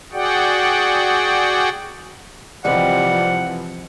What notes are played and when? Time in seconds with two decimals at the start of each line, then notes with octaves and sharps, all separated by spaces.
0.13 F#4 G#4 D5 F#5 G5
2.65 C3 E3 F3 G3 G#3 C4 B4 F#5